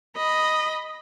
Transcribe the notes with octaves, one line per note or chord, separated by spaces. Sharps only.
D#5 B5